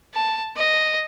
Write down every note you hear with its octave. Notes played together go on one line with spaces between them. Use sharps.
A5
D#5